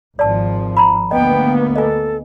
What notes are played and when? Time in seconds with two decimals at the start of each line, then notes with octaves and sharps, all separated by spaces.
0.19 G#1 F3 D5 A5
0.77 A#5 B5
1.11 D2 A#3 B3 D#5 G5
1.76 A4 D#5 G#5